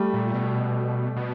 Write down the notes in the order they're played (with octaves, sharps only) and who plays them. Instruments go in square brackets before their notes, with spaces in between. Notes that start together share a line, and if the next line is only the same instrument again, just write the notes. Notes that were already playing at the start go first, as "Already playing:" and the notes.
Already playing: [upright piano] G3 A3
[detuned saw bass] A#2
B2
B2